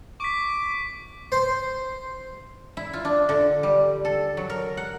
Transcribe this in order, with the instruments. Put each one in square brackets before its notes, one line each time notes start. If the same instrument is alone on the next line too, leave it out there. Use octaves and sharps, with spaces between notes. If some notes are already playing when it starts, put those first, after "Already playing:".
[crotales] C#6 B6 [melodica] D6
[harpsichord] C5
[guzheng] E4
F4
D4
D3
G3
A4
F#3
A#4
F#5